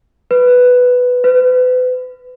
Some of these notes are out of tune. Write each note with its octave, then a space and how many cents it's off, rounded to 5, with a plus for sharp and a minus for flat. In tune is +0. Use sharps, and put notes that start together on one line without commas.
B4 +5
B4 +35